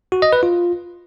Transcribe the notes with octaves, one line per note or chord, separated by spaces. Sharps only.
F#4
D#5
B4
F4